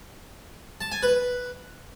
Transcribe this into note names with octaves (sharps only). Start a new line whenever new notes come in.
A5
G#5
B4